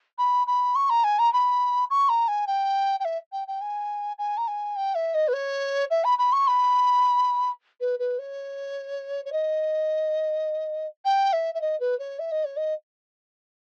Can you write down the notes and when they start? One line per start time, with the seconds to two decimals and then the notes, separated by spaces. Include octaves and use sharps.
0.18 B5
0.47 B5
0.75 C#6
0.90 A#5
1.04 G#5
1.19 A#5
1.33 B5
1.90 C#6
2.09 A#5
2.28 G#5
2.47 G5
3.00 G5
3.05 E5
3.32 G5
3.48 G5
3.61 G#5
4.18 G#5
4.38 A#5
4.48 G#5
4.76 G5
4.95 E5
5.14 D#5
5.28 B4
5.33 C#5
5.90 E5
6.04 B5
6.19 B5
6.33 C#6
6.47 B5
7.81 B4
7.99 B4
8.19 C#5
9.25 C#5
9.32 D#5
11.05 G5
11.33 E5
11.55 E5
11.61 D#5
11.80 B4
11.99 C#5
12.19 E5
12.32 D#5
12.45 C#5
12.57 D#5